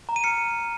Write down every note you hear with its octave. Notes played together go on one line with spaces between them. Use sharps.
A#5
D#7
F6 C#7